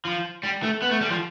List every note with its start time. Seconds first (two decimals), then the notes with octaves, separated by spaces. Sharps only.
0.05 F3
0.43 G3
0.63 A3
0.82 B3
0.91 A3
1.01 G3
1.10 F3